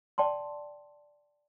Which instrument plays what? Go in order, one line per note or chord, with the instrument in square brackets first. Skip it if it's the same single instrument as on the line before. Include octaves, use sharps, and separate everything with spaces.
[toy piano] D5 G5 A5 C6